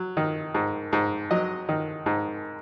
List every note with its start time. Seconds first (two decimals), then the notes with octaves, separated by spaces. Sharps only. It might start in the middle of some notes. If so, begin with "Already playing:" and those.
Already playing: F#3
0.17 D#3
0.55 G#2
0.93 G#2
1.31 F#3 D#5
1.69 D#3
2.06 G#2